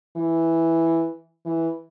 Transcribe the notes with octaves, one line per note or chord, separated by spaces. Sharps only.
E3
E3